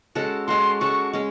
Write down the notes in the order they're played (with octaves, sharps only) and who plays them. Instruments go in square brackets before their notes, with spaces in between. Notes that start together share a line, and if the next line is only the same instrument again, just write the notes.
[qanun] G#3 C#4 F#4 A4
[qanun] G#3 C#4 F#4 A4 [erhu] C6
[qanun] G#3 C#4 F#4 A4 [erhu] C#6
[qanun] G#3 C#4